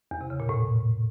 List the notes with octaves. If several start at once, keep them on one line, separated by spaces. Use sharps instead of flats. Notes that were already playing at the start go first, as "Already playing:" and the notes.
E2
C3
C#3
A#2
A2